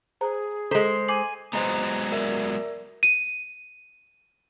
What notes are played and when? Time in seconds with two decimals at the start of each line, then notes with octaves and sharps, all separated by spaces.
0.21 G#4 C5 A#5
0.71 G#3 A4 C5 A#5 B6
1.08 G#5 D6 C7 F#7
1.53 F#3 G#3 B3 C5 D#5 A#5
2.12 A#4 D5 E5
3.03 D#7